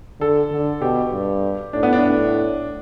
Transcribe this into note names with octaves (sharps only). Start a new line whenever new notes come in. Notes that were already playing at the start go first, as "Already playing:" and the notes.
D3 A4
D3
B2 G4
G2
A2 D4
B3
D4
A2